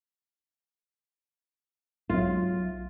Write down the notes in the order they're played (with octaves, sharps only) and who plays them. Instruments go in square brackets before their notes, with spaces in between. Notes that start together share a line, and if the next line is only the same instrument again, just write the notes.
[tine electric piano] B1 F#3 E5 [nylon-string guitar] F4